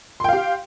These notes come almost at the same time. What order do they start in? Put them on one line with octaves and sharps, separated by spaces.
C6 G5 F5 G4